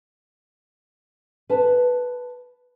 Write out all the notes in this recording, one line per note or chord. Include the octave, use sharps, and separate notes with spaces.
B4 A5